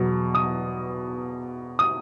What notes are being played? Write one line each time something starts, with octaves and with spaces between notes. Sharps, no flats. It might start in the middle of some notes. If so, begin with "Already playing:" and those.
Already playing: E2 B2 F#3
D#6
D#6